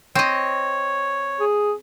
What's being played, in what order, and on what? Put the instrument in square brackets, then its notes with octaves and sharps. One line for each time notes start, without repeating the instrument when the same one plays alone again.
[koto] C4 D#5 [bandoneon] C#5
[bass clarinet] G#4